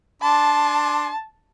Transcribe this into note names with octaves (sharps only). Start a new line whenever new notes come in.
D4 A5 C6